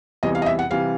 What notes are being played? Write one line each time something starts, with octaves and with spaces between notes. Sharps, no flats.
E2 C3 E3 G3 D#5
F5
D#5
E5
F#5
C3 E3 G3 F5